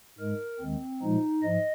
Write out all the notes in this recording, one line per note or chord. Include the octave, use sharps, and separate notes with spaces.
G#2 G#3 A#4
D#2 D#3 G#3 C4
A#2 F3 G#3 D#4
G#2 F3 D#5